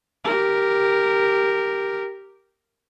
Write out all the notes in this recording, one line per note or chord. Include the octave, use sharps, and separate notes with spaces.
G4 A#4